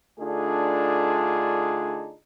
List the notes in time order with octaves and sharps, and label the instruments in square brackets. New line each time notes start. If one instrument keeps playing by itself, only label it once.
[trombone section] D3 A3 D4 D#4 F4 G#4